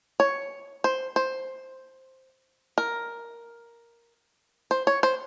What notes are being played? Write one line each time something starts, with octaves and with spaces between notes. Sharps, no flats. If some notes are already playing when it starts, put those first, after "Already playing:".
C#5
C5
C5
A#4
C5
C#5
C5